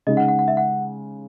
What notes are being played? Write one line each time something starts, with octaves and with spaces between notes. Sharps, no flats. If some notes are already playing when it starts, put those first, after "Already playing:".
C#3 G#3 D#4 D#5
F#5
F#5
F#5
E5
F#5